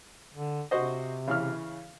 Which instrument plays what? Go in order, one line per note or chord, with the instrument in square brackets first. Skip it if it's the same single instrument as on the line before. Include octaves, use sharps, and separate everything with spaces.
[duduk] D3
[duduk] C3 [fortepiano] F#4 C5 D#5
[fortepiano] C#3 E3 F6